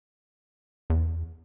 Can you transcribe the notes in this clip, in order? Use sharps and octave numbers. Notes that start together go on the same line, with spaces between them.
E2